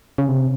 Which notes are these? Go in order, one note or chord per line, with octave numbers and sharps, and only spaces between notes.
C#3
C3